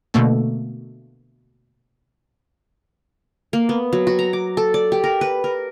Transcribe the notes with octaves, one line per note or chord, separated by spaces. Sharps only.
B2 D3 A3 A#3 A4
A#3
B3
F#3
F#4
A#5
D6
A4
D5
G4
A#4
B4
A#4